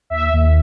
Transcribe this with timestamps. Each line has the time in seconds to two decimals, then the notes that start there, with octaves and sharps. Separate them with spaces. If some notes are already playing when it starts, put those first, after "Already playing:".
0.10 D#2 E5
0.33 D#2